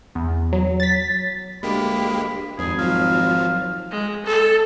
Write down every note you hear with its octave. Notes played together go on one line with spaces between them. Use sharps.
E2
F#3
A6 B6
D2 G#3 A#3 G4 B5
G#1 F2 G#4
F3 F#3 F5
G#3
A4